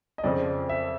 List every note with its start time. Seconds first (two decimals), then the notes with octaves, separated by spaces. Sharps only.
0.18 D#5
0.24 F2 C#3 F3 D5
0.69 E5